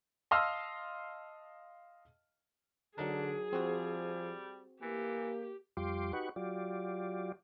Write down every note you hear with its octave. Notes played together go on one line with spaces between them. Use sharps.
D#5 F5 A5 C6 E6 F6
D3 F#3 D4 D#4 G#4 A#4
F3 G3 C4 F#4
E3 A#3 G4
F2 G3 F4 G4 C6 D6
D#4 F#4 G4 B4 F#5 C#6
F#3 F4 G4 D5